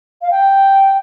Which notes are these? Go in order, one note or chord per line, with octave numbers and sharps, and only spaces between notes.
F5
G5